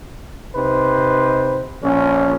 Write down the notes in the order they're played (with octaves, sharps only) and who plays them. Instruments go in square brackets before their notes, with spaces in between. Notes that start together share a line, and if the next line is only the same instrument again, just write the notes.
[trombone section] C3 D#4 B4 C5
A#1 C#4